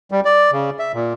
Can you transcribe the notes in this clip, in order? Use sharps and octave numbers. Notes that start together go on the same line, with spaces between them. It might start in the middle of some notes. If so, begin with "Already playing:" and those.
G3
D5
C#3
E5
A#2